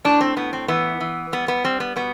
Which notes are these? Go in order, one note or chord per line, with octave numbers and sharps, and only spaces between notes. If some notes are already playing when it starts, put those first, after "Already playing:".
A2 D4
C4
A2 B3
C4
E3 B3
E3
G3 B3
B3
G3 C4
B3
B2 B3